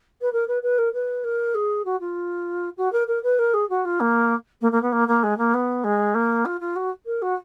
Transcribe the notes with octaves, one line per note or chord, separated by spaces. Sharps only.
B4
A#4
B4
B4
A#4
B4
A#4
G#4
F#4
F4
F#4
A#4
A#4
B4
A#4
G#4
F#4
F4
A#3
A#3
A#3
B3
A#3
A#3
G#3
A#3
B3
G#3
A#3
F4
F4
F#4
A#4
F#4